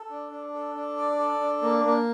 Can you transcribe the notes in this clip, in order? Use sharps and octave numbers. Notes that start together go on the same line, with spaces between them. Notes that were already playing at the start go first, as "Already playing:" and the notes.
Already playing: A4
D4
D4
A4
D4
D5
A4
D4
A#3
A#3